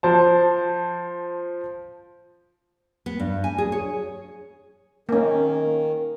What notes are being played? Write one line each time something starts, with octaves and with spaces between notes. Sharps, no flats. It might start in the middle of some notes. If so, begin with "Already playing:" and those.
F3 C5 A5
B3
G2
G#5
G#4
C#5
D#3 A#3 C#4